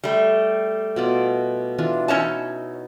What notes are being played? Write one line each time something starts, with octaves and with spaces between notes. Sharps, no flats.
G3 A3
B2 F4 D5
E3 D4 F4
C#4 D#4 E4 B4 C#5 A5